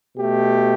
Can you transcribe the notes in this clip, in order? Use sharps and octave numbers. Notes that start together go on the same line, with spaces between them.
B2 A3 G4